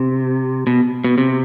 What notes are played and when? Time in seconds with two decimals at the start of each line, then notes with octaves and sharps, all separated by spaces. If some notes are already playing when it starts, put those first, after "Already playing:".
Already playing: C3
0.67 B2
1.04 B2
1.18 C3